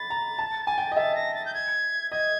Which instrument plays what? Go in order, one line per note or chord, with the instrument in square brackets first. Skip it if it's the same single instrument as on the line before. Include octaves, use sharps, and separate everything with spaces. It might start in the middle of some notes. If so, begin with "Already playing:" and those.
Already playing: [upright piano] B5 [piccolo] A6
[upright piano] A#5
A5
G#5
G5
D#5
[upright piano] E5 [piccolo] A6
[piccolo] A#6
A6
G6
G#6
[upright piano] D#5 [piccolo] G#6